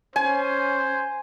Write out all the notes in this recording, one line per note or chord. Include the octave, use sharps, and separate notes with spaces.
C#4 C5 G#5